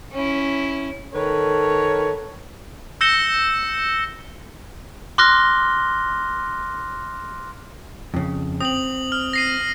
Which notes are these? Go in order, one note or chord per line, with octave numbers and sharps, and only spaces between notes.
C#4 E4
D#3 A4 B4 C#5
E6 G6 A#6 C#7 E7 G7
C6 D6 F6 F#6 A#6 G7
F2 C#3
C4 D#6 F#7
F6
A#6 C7 D#7